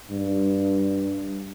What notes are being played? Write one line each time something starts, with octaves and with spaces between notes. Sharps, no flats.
G2